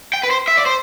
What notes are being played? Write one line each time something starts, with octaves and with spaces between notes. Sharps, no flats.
G5
B4
C5
E5
D5
C5